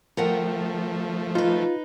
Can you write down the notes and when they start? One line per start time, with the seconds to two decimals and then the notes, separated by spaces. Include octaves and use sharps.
0.17 F3 A3 A#4 F#5 G5
1.35 D#4 F4 B4